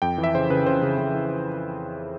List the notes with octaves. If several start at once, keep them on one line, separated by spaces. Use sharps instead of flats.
F2 G5
E3
E5
C#3 C5
C#3 B4
C#3 C5
C#3
C#3
E3